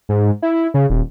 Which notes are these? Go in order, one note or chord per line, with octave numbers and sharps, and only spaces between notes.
G#2
E4
C#3
D#1